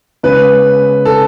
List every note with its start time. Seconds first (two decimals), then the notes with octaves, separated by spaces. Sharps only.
0.23 C#3 G#3 B3 B4
1.05 A4